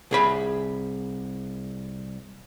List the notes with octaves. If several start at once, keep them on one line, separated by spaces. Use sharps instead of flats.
C2 G#4 B5